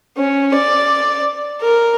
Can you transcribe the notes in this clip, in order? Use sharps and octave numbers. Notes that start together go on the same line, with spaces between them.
C#4
D5
A#4